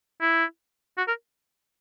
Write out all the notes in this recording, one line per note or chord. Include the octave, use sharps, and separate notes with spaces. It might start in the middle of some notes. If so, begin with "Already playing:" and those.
E4
F#4
A#4